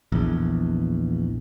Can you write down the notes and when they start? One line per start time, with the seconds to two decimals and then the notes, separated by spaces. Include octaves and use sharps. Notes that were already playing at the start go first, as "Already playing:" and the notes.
0.12 A#1 E2